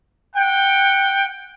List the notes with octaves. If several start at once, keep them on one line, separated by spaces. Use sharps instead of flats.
F#5 G5